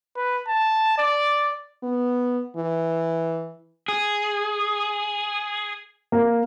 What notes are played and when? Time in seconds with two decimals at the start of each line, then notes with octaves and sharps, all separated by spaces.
0.16 B4
0.48 A5
0.98 D5
1.84 B3
2.57 E3
3.88 G#4
6.12 A#3